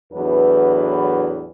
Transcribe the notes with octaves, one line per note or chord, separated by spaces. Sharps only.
E2 A2 F#3 D4 B4